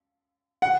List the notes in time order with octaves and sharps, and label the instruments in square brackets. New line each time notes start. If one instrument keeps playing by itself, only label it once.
[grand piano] F#5